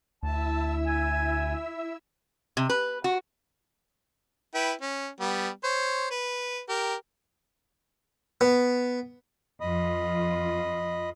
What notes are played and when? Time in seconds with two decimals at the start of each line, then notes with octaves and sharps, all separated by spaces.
0.23 D2 E4 E5 A5 E6
0.86 G#5
2.57 C3
2.70 B4
3.04 F#4
4.55 E4 B4 G5
4.81 C#4
5.20 G3 B3
5.64 C5 C#5
6.11 B4
6.69 G4 A#4
8.41 B3
9.61 F2 F4 D#5 B5 D#6